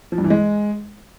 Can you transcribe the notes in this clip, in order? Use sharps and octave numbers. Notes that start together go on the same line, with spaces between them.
F3
G2
E3
G#3